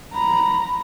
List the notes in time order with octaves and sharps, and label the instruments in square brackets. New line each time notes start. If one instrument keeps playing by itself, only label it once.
[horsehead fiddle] A#5 [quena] B5